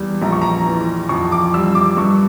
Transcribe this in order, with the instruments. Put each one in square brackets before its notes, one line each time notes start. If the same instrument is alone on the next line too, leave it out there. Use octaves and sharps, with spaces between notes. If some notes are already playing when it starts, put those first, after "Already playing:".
Already playing: [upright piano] E2 G3
A#1 A#5
C#6
A#5
E3
F2 C#6
D6
G3 E6
D6
G2 C#6